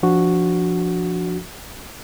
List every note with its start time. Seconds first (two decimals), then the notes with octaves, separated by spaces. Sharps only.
0.03 F3 D4 F#4